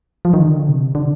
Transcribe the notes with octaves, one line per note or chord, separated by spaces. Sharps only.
F3
D#3
D3
C3
D3